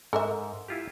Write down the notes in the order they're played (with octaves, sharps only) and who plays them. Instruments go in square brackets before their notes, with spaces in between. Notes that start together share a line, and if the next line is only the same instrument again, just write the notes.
[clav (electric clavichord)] G#2 [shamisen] A4 A#4 E5
[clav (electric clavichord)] E4 F4 G4